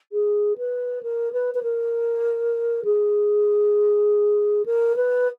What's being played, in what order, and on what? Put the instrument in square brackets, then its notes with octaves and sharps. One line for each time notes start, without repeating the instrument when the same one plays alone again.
[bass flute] G#4
B4
A#4
B4
B4
A#4
G#4
A#4
B4